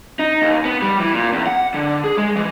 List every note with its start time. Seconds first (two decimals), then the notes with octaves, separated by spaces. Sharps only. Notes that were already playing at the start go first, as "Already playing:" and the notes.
0.19 D#4
0.42 D#2
0.65 B3
0.82 G3
1.00 E3
1.13 A#2
1.33 E2
1.46 F#5
1.74 D3
2.04 G#4
2.17 G#3
2.36 E3